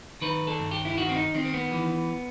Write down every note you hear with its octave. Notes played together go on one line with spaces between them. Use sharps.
D#3 B4
A4
G2
G4
E4
D#3 F#4
C4
D#4
D#3 C4
C4
B3
E3